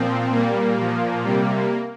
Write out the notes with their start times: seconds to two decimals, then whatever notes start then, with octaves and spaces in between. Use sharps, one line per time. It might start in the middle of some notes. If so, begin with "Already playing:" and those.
Already playing: A#2 F3 C4
0.30 A#2 G3 A#3
0.77 A#2 F3
1.23 C3 G3